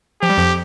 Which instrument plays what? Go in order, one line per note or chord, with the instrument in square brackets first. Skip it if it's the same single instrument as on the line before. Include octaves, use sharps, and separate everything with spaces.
[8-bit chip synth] F3 [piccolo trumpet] G4
[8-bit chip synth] G3
F2 F3